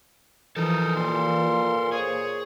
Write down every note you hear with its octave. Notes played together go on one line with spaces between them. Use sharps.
E3 F3 D#4 A4 A#4
A#2 C6
G#4 C5 C#5